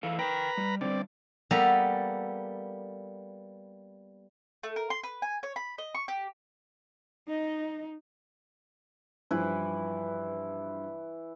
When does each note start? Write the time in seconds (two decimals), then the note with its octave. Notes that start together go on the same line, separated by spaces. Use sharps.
0.03 E3 A4 F5
0.19 A#4 B4 G5 A#5 B5
0.57 G3
0.81 D3 G3 C4 D5
1.51 G3 A#3 B3 A4 A#5
4.63 A3
4.76 A#4
4.90 C6
5.03 B4
5.22 G#5
5.43 C#5
5.56 B5
5.78 D#5
5.95 C#6
6.08 G4
7.28 D#4 D#5
9.31 G2 E3 F3 E4 B4 C5